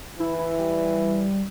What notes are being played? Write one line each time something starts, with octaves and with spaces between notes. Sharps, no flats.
E3 E4
E4
G3